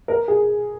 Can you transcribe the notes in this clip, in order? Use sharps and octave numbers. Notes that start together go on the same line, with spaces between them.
A#4
G#4